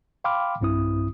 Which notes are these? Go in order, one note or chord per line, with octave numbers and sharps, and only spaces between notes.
F5 G5 B5 C6 D6 F6
B1 G2 C4 E4 D#6